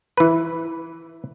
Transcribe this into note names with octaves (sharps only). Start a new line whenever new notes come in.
E3 B4